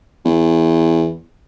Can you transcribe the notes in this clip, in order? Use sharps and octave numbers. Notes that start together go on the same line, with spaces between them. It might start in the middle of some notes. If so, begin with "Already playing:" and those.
E2